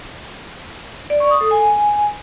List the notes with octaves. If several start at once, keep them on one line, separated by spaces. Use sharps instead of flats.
D5
C#6
D#6
A4
G#5